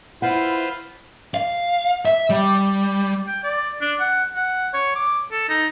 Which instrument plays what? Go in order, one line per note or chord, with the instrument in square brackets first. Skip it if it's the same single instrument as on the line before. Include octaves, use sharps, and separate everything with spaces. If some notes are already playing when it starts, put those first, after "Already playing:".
[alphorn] E4 [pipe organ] F4 B4 C5 [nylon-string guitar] F#5
[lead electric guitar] F5
E5
G3
[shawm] G5
D5
D4
F#5
F#5
C#5
D6
A4
D#4